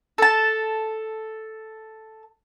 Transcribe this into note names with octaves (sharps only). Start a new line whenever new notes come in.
A4 A5